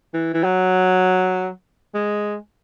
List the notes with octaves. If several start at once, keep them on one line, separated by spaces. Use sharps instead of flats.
E3
E3
F#3
G#3